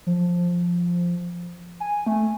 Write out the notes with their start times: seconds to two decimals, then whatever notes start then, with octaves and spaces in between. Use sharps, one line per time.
0.07 F3
1.80 G#5
2.07 A3